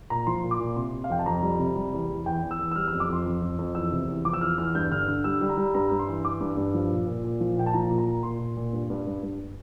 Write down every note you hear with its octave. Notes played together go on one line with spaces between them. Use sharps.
A#2 A#5
F3 C6
A#2
D6
A#2
C3 C6
C3
F5
F2 G5
A5
F2 A#5
G3
C3
G3
E2
E2
E2 G5
E2
E6
E2
E6
G3 F6
F2 E6
D6
F2 C6
F2
F2
F2
E2 E6
C3
E2
F3 D6
E6
E2 F6
E2 F6
G2 G6
D3 F6
D3
G3 E6
G3
A#5
G3
G2 A#5
G2
C6
E3
E3 D6
G2
G2
F3
A#2
A#2
A#2
F3
A#2 G5
A5
F3 A#5
A#2
A#5
A#2
A#2 C6
A#2
A#2
G2
G2
G2
G2